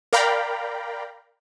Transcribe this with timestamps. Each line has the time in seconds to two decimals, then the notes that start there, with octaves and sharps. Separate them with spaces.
0.13 A#4 D5 F5 G5 A#5 B5